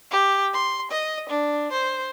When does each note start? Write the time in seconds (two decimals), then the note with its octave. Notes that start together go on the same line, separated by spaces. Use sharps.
0.11 G4
0.53 C6
0.91 D#5
1.29 D4
1.72 C5